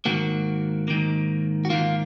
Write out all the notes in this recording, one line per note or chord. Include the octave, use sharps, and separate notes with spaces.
G#2 D#3 A#3 F#4
G#2 D#3 A#3
F#4
G#2 D#3 A#3 F4